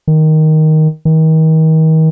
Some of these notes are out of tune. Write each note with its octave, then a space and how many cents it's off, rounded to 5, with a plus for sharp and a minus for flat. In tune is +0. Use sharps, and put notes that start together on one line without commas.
D#3 +5
D#3 +35